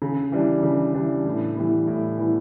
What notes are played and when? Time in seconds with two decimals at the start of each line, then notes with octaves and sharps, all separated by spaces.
0.02 C#3
0.32 E3 G3 D4
0.63 C#3
0.94 E3 G3 D4
1.25 A2
1.57 E3 G3 B3
1.87 A2
2.18 E3 G3 B3